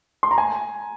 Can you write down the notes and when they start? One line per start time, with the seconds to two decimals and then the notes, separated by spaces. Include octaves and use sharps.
0.23 C6
0.31 A#5
0.38 G#5